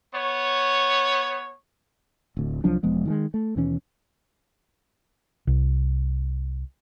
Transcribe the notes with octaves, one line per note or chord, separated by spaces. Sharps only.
B3 C#5
D1 D2
C2 F3 F#3 D4
E1 F3 G#3 B3
D#3 E3 G#3
A3
D#2 B2 E3 C#4
C2